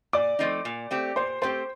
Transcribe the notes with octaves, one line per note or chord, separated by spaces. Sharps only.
A#2 D5 D6
F3 A3 C4 D#4
A#2
A3 C4 G4
A#2 C5 C6
A3 C4 G4 C5 C6